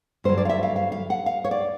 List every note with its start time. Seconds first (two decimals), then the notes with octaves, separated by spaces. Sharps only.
0.24 G2 D3 F#3 C5
0.38 D5
0.45 F5
0.49 E5
0.63 F5
0.76 F5
0.92 F5
1.10 F#5
1.26 F5
1.44 C#5
1.51 D5